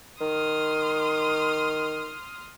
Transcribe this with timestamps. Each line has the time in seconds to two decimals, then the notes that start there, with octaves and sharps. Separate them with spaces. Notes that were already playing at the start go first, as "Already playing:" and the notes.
0.21 D#3 C6 D#6 F6